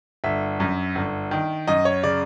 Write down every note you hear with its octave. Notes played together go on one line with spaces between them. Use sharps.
G1 E5
F#2
G1
D#3
F#2 D#5
C#5
C#3 D5